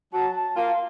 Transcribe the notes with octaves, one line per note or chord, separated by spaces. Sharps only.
F#3 A5
A5
A#3 F4 F5
F5